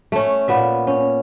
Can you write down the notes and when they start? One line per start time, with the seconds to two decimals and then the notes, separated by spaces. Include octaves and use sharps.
0.12 A3 C#4
0.48 A#2 B3 E5
0.87 C#4